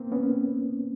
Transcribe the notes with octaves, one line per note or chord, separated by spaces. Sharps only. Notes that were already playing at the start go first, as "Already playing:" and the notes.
Already playing: A#3 C4
B3 C#4